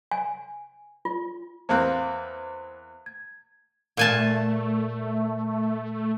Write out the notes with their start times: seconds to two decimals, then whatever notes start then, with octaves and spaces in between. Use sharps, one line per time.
0.11 G#5
1.05 F4
1.69 E2 A#3 C4 C5 F#6
3.06 G#6
3.97 A#2 A3 G#5 A5